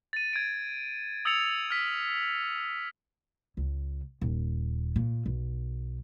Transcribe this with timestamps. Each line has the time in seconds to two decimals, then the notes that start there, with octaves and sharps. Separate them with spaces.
0.13 A6 D#7
0.33 G#6 D7
1.25 D#6 E6 G#6 A6 C#7 F7
1.70 F6 B6
3.57 C#2
4.21 D#1
4.96 A#2
5.26 B1